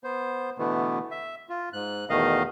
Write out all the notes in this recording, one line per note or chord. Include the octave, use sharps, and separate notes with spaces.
B3 C5
B2 D3 E3 A3 B3
E5
F4
G#2 F#6
E2 B2 D#3 A3 D#5 F5